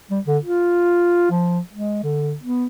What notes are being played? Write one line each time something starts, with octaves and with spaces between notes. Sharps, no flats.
G3
D3
F4
F3
G#3
D3
B3